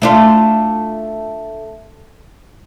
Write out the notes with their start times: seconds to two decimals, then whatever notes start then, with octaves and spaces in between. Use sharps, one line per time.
0.02 A3 D4 F4